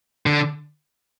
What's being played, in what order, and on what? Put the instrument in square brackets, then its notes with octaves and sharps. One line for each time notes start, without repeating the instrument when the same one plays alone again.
[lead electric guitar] D3